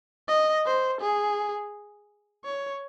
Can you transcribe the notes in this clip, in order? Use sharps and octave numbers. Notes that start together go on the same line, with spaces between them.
D#5
C5
G#4
C#5